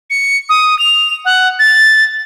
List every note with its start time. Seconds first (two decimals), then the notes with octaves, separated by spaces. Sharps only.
0.10 C#7
0.49 D#6
0.79 F7
1.25 F#5
1.59 A6